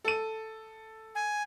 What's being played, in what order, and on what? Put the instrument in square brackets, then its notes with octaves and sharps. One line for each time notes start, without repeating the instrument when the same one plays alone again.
[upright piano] A4 D#7
[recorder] G#5